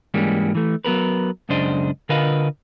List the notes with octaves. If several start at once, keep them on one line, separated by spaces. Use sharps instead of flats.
G#2 E3 G3 G#3 A#3 C#4
E3 A3
F#3 B3 A#4 B4
C#2 F#2 C#3 D4 C5 D#5
D3 F4 A#4 B4 D#5 F5